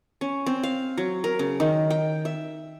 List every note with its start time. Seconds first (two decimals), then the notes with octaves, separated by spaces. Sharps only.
0.21 C#4
0.46 C4
0.63 F5
0.98 F#3
1.24 A#4
1.39 C#3
1.60 D#3
1.90 G5
2.25 E5